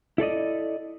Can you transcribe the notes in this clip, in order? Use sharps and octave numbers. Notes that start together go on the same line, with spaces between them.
E4 A4 D5 D#5